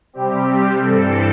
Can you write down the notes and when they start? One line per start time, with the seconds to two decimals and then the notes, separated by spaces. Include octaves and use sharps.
0.13 C3 G3 C4 G4
0.81 G2 E3 G3 C4 A4